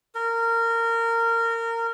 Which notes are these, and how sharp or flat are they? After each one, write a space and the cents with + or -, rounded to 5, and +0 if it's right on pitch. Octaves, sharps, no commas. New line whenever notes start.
A#4 -20